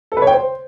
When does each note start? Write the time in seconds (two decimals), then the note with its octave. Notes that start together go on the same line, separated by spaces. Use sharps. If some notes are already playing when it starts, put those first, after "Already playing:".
0.12 A4
0.17 B4
0.22 C#5
0.27 G5
0.32 C5